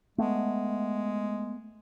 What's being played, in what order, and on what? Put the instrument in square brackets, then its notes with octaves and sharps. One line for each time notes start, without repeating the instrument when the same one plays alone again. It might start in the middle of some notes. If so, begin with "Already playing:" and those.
[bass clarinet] G#3 [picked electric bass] A3 B3